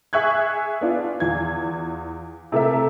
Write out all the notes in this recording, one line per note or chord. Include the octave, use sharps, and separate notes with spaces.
G#4 E5 G#5 C#6 F#6 G#6
B3 D4 F4
E2 F4 G#6
C3 A3 A#4 E5